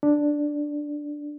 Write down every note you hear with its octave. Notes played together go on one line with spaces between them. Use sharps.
D4